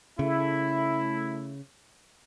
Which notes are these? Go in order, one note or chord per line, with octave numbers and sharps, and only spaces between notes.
C#3 A3 E4